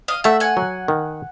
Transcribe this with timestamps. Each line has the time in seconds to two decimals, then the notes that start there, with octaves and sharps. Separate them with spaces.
0.08 D#5 F5
0.24 A3 E5 F#5
0.40 F#5 G#5
0.57 F#3
0.88 D#3